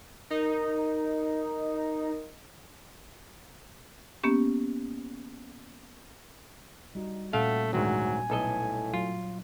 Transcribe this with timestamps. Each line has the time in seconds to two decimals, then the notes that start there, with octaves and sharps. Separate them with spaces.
0.31 D#4 A#4
4.24 A#3 B3 C#4 G4
6.95 G3 D#4 F#4
7.33 A#2 A3 C#4 F5 F#5
7.73 G#1 D2 G#2 F#3 G#5
8.30 B1 A2 A4 D#5
8.94 F#3 F4